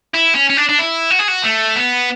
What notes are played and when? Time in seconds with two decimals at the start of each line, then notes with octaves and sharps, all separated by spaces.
0.14 E4
0.35 C#4
0.50 C#4
0.57 D4
0.69 D4
0.79 E4
1.10 F#4
1.19 G#4
1.28 F#4
1.44 A3
1.76 B3